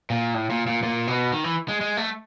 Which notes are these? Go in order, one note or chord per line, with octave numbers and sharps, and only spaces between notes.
A#2
A2
A#2
A#2
A#2
B2
D#3
E3
G#3
G#3
A3